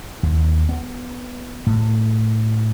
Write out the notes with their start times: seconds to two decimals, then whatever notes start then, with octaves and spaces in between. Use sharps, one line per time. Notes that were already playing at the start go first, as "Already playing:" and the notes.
0.23 D#2
0.69 B3
1.67 A2